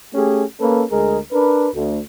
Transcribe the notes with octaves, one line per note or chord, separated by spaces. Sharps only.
A3 C#4 G4 G#4
A#3 C#4 A4 B4
D2 G#3 G#4 A#4
D4 A#4 B4
D2